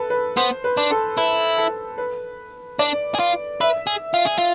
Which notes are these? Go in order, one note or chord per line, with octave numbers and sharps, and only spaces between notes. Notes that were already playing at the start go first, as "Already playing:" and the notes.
Already playing: A4 B4
B4
B3 C5
B4
D4
A4
E4 B4
A4
B4
D4 D5
G#4
F4
B4 E5
G#4
F4
G#4
F4